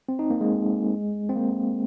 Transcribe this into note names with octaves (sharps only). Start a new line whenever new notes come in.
C4
D#4
A#3
G#3
C4
A#3